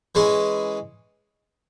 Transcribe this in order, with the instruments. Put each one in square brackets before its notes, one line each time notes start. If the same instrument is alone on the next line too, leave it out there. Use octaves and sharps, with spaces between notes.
[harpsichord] E3 G#3 C#4